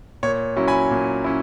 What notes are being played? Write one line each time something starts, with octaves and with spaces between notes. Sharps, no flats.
A#2 C#5
F#3 C#4 E4
G#5 B5
A#2
C#4 E4